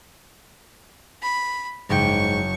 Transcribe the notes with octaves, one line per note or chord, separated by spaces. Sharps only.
B5
F#1 G#2 G5 C#6